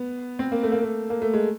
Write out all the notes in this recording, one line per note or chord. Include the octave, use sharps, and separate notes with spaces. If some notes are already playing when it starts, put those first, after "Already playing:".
Already playing: B3
C4
A#3
A3
A#3
A3
A#3
A3
G#3